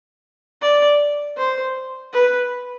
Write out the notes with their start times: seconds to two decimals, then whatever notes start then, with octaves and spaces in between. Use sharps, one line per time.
0.62 D5
1.38 C5
2.13 B4